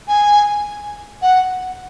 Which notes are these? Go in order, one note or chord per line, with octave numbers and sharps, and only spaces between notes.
G#5
F#5